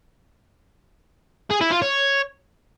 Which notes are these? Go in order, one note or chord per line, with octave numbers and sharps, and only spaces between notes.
G#4
E4
F4
C#5